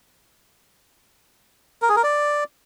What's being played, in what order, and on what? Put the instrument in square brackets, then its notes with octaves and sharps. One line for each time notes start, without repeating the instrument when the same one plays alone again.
[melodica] A#4
G#4
A#4
D5